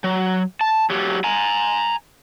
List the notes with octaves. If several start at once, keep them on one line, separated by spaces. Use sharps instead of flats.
F#3
A5
F#3 G4
G#5 A#5